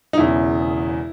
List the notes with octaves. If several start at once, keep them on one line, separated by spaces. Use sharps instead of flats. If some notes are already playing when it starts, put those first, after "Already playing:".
D#4
E1 E2 C#3 E4